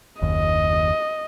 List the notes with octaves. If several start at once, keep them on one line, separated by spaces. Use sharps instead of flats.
F#1 D#2 D#5